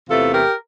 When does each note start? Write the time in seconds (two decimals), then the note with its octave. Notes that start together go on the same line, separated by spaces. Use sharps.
0.09 E2 C3 E3 A3 F4 A4
0.33 G4 A#4